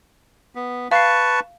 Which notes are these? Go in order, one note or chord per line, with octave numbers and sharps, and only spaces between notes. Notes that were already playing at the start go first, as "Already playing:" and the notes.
B3
B4 F5 A5 C#6 C7